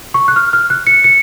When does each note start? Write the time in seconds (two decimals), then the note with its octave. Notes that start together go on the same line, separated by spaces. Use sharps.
0.14 C#6
0.28 F#6
0.36 F6
0.53 F6
0.70 F#6
0.87 C#7
1.04 C#7